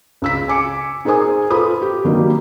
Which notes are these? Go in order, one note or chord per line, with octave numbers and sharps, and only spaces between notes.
C#2 E6 B6
G#5 D6 C#7
D#4 G#4 A#4 C5 G#5 D#6
F4 A4 B4 C5 B5 D#6
G4
D#3 F#3 G3 A#3 D4